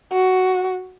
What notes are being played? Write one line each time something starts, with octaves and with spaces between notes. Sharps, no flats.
F#4